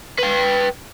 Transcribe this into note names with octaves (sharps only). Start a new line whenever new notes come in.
B4 G5